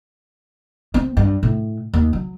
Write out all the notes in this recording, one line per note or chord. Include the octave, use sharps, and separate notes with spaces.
C4
G2
A2
D#2
F#3